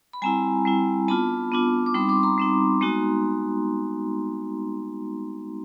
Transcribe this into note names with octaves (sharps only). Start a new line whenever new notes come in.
B5
G3 C4 E4 G#5 A#5
G3 C4 E4
B3 D4 F4 A5 B5
B3 D4 F4
D6
G3 C4 D#4 B5 C#6
C6 D6
A#5 C6
G3 C4 D#4
G#3 B3 D#4 F#4